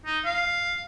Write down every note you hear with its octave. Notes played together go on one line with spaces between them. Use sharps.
D#4
F5